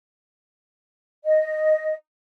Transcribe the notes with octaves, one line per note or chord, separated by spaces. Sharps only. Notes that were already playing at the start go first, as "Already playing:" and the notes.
D#5